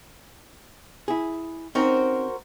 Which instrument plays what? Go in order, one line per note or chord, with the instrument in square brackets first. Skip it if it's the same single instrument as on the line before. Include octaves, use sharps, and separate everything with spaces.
[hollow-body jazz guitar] E4 G#4
[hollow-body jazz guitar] C4 C#4 D#4 [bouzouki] F#4 A#4 C5